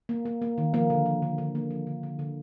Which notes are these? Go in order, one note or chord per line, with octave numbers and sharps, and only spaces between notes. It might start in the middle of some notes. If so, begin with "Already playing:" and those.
A#3
A#3
A#3
D#3
F3 A#3
D3
F3
D3
D3
A#3
F3
D3
D3
D3